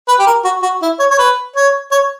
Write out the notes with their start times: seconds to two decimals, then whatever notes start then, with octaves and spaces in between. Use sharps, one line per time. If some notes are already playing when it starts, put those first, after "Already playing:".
0.08 B4
0.19 G4
0.27 A#4
0.44 F#4
0.62 F#4
0.82 E4
0.99 C#5
1.11 C#5
1.18 B4
1.56 C#5
1.92 C#5